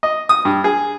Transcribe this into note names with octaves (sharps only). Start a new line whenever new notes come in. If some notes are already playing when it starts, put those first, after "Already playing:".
D#5
D#6
G2
G#4